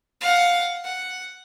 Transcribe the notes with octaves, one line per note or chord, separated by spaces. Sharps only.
F5 F#5
F#5